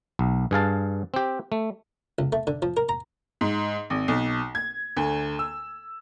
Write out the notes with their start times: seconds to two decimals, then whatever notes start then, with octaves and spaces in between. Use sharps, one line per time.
0.19 B1
0.51 G2 G#4 F5 A5
1.14 C4 G4
1.52 A3
2.19 C#2
2.32 A3
2.47 D3
2.62 F3
2.77 A#4
2.89 A#5
3.41 G#2
3.90 G#1
4.08 B1
4.55 G#6
4.97 D2
5.39 E6